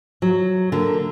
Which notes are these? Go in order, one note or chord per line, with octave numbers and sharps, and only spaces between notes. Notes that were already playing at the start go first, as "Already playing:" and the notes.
F#3
D3 A#3